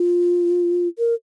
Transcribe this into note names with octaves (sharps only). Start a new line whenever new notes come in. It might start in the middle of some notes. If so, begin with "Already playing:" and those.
Already playing: F4
A#4